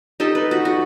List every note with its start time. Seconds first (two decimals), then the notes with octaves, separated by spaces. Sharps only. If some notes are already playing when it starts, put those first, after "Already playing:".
0.20 D#4 G4 A4 D#5
0.35 B4
0.51 F#4
0.65 F#4